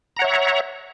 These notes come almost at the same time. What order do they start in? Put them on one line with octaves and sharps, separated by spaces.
A#5 F#5 C#5 E5